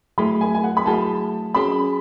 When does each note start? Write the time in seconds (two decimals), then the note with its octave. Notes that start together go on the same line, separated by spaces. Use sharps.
0.18 F#3 A3 E4 G#4 B5
0.41 G#5
0.54 G#5
0.64 F#5
0.77 B5
0.86 F#3 A3 E4 G#4 A5
1.54 F#3 C#4 G#4 B5